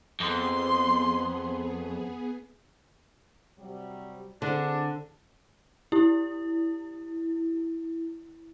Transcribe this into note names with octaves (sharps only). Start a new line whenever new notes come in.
F2 B3 G#4 C6
C3 F#3 G3
D3 C4 D4 G#4
E4 G4